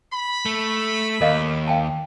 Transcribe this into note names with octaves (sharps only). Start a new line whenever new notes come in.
B5
A3
D#2 A#4 D#5 F5
F5 G5 A5